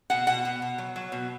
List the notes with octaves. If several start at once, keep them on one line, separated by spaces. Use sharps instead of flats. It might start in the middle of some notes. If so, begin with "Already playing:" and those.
B2 F#5
B2 F#5
B2
B2
F#3
F#3
B2